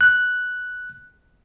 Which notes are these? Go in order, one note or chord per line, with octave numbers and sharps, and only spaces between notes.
F#6